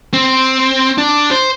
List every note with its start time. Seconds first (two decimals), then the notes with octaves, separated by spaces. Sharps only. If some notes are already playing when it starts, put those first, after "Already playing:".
0.13 C4
0.98 D4
1.31 C5